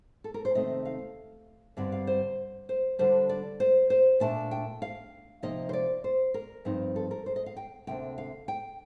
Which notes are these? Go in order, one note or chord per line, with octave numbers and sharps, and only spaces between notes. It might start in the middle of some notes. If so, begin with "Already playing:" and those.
A4
A#4
C5
C3 D#3 A3 C4 D#4 D#5
F5
G2 D3 G3 C4
F5
C5
C5
D3 G3 D4 C5
D5
C5
C5
A#2 A3 D4 A5
G5
F5
C3 F3 A#3 D#4 D#5
C5
D5
C5
A#4
G2 F3 C4 D#4
A4
A#4
C5
D#5
F5
G5
D2 C3 F3 A#3 D4 G5
F5
G5